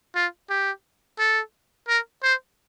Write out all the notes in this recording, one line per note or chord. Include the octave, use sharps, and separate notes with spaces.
F4
G4
A4
A#4
C5